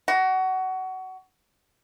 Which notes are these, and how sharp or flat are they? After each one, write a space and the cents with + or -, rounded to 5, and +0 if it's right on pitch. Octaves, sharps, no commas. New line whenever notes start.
F#4 +20